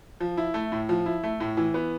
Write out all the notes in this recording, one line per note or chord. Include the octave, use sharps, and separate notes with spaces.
F3
E4
A3
A2
F3
E4
A3
A2
E3
B3